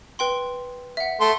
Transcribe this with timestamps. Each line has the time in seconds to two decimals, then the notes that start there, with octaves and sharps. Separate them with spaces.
0.19 B4 G5 C6
0.97 E5 F#5
1.20 A3 C6